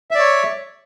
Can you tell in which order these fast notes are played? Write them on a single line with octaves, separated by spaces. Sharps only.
E5 D5 C#5